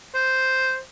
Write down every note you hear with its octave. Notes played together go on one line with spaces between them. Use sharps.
C5